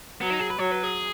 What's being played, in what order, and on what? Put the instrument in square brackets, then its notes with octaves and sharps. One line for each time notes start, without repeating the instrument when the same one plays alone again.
[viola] F#3 [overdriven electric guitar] B3
[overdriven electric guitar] D#4
G#4
B4
[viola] F#3 [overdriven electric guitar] C#5
[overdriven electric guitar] B4
G#4